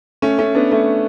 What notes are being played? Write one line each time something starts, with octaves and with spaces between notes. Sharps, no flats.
A3 C#4
A3 C#4
B3 D4
A3 C#4